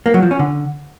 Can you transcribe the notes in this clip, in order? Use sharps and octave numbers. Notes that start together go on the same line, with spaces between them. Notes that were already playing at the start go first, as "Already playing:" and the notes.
A#3
F#3
F3
C#4
D3